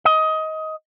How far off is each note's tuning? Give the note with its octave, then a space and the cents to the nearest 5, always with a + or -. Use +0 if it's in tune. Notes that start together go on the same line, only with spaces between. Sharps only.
D#5 +20